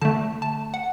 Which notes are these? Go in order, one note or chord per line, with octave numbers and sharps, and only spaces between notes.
D3 A3 A5
A5
F#5